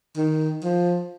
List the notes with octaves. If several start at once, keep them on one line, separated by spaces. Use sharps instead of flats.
D#3
F3